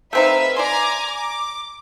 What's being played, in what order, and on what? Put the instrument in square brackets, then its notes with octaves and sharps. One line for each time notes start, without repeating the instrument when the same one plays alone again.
[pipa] A3 C4 D#4 [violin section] B4 E5 F5
[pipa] D5 C6 [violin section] G#5 A#5 D6
[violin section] D6